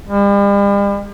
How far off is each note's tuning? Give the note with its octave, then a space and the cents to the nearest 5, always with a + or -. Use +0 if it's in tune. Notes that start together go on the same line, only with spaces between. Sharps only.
G3 +45